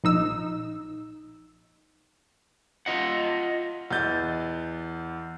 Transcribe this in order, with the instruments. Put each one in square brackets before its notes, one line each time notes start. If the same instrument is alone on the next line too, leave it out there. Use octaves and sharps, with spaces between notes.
[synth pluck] A#1 D#4 E6
[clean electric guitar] F4 D#5 F#5
[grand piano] E2 D#5 G6 A6